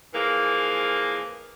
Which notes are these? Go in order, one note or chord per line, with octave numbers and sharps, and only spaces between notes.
E3 F3 G#3 A#3